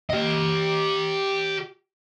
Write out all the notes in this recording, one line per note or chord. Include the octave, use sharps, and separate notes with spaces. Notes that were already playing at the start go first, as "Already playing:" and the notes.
G4 D#5